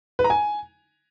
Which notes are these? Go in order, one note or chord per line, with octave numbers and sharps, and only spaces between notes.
B4
A#5
G#5